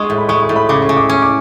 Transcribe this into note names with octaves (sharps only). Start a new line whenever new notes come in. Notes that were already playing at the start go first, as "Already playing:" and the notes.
Already playing: G#3 D4 C#6
A2
B5
G#3 C#6
C#6
A2
B5
C#3 D6
C#6
C#3
D6
C#4
D6